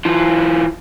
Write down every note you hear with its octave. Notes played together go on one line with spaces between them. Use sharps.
E3 F4